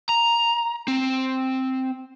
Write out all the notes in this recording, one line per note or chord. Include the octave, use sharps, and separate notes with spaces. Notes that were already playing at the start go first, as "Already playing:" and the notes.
A#5
C4